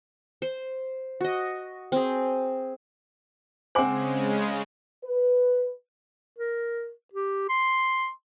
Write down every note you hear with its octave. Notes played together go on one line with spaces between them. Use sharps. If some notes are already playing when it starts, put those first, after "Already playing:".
C5
F#4 D#5
C4 G#4
C#3 G#3 C4 C5 F#5 G#5 D6 F#7
B4
A#4
G4
C6